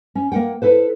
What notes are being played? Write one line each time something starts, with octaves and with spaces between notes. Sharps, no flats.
C#4
A#3 A#4 F#5 G5
E4 A4 B4 C5